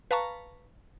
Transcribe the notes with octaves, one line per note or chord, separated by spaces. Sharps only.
B4 F5 A5 A#5 C#6